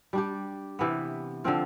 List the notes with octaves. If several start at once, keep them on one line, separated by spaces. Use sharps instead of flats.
G3 D4 G4
C3 E3 B3
D3 F3 C4 F4